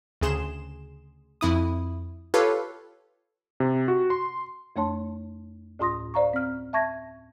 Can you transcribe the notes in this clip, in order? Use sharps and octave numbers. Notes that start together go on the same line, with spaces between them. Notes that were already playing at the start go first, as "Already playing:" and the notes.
D2 C#3 G#4 C6 E7
F2 E4 D#6
F4 G4 A4 B4 C#5 F5
C3
F#4
C6
F2 A3 D4 C#5 A5 C6
D2 A2 F4 C6 D#6 A#6
C5 D5 F5 A#5 C#6
C4 F6
E5 A5 C#6 G#6 A#6